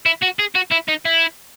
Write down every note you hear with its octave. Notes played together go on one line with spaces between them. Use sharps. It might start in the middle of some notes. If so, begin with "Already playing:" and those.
E4
F#4
G#4
F#4
E4
D#4
E4